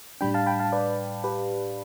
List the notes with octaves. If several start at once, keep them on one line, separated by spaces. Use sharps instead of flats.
A2 G3 D4 G5 B5
F5 A5
G5 B5
F5 A5
B4 D5
G4 B4